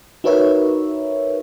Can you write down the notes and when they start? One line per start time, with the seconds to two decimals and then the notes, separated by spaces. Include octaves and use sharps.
0.24 D#4 F#4 A#4 B4 C#5 E5